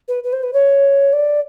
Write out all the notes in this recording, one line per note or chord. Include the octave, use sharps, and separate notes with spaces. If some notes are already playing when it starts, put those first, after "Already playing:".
B4
B4
C5
B4
C#5
D5